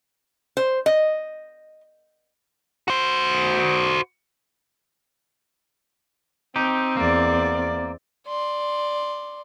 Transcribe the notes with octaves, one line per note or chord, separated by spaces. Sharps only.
C5
D#5
F#4 C5
C4 D#4 G4
E2 A#3 D5
D5 C6